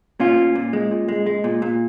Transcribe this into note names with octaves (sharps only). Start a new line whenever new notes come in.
A#2 C#4 F4
A#2
A#2
G#3
A#2
G#3
G#3
A#2
A#2